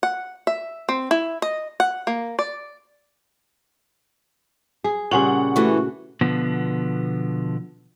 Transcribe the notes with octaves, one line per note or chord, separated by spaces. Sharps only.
F#5
E5
C4
E4
D#5
F#5
A#3
D5
G#4
A#2 C#3 G3 C#4 G#4 F#5 F#7
E3 A3 F#4
B2 D3 F3 B3